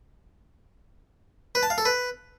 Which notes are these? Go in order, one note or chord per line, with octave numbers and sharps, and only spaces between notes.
B4
A5
F5
A4
B4